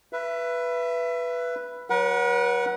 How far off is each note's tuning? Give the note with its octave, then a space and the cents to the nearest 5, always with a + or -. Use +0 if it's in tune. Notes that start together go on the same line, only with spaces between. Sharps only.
B4 -5 E5 +25
F#3 +0 B4 -45 F#5 +0